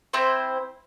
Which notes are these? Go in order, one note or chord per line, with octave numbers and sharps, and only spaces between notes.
C4 E4 C5